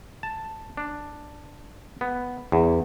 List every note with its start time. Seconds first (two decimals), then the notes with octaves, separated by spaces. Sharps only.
0.23 A5
0.77 D4
2.01 B3
2.52 E2